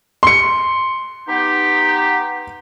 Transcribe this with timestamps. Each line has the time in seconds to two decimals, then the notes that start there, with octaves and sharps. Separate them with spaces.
0.23 C6 C#7
1.28 B3 D#4 G4